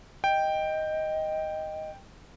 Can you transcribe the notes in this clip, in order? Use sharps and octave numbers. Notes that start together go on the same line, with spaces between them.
D#5 G5